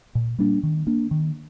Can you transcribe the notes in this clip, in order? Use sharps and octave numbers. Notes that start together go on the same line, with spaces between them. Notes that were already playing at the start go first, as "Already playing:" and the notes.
A#2
G3 A#3 D4
D#3
A#3 D4
D#3